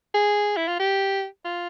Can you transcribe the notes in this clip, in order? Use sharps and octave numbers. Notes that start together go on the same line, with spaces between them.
G#4
E4
F4
G4
F4